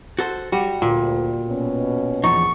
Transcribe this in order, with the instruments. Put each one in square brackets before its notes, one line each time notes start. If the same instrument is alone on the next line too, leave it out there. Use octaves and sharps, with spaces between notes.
[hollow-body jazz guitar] F#4 A4 C5
[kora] G3 [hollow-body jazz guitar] F#4
[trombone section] D2 [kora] A#2
[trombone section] B2 C#4
[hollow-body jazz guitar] E2 F3 D#4 [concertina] C#6